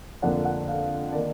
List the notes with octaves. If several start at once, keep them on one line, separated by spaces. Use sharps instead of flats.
F2 D3 F3 A#3 D4 F#5
F#5
F5
D#3 A#3 D#4 D5